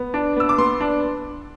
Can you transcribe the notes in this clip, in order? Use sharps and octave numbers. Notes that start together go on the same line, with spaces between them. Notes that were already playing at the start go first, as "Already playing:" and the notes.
Already playing: B3
D4
B3 E6
D6
B3 C6
D4